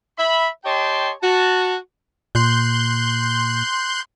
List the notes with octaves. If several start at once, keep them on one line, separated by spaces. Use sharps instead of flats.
E5 B5
G4 C#5 D#5 G5 A5 C6
F#4 A5
A#2 C6 F#6 G6